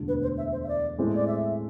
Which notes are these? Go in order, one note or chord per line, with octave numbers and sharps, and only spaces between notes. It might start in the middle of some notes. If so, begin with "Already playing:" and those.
Already playing: E1 D2 D3 A3
B4
C5
E5
C5
E5
D5
A2 G#3 C4
D5
E5